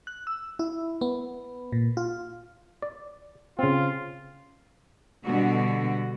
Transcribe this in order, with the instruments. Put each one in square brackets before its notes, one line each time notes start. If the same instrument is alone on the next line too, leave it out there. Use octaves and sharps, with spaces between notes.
[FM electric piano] F#6
E6
E4
B3
A#2
F4
[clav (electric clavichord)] D5
[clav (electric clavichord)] C#3 C4 [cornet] F4
[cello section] B2 D3 G3 F#4